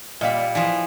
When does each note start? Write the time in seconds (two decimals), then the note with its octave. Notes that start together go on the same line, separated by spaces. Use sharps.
0.21 A#2 G3 D#5 F5 B5
0.55 E3 F3